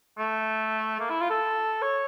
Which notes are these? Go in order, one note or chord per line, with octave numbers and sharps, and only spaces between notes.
A3
A#3
E4
F4
A4
C#5